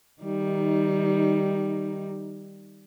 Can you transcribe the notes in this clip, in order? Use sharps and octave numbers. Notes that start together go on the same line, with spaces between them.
D#3 G3 D#4